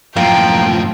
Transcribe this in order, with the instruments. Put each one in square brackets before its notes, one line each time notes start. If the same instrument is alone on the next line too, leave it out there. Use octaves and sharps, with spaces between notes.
[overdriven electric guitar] F#2 A2 [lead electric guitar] F3 [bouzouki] A#3 [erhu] G5